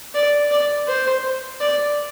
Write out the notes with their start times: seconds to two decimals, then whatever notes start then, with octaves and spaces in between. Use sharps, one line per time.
0.15 D5
0.51 D5
0.88 C5
1.61 D5